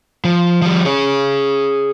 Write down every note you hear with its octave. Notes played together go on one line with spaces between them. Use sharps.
F3
F3 G3
G#4 C#5